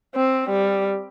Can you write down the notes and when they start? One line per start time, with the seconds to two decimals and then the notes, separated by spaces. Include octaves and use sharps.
0.15 C4
0.50 G3